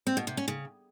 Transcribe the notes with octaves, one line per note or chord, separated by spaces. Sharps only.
C4
B2
C3
C#4
C#3